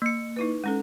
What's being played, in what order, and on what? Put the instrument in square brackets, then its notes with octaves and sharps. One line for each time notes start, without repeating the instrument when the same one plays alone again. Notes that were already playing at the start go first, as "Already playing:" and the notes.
[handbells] A#3 C#7
[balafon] D#4 E4 B4
G#3 C#4 A4